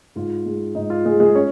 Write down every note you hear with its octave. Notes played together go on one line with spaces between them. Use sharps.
G#2 F4
G#3
G#2 D#4
F4
G#3 G#4
G#3 G#4
C#4 C#5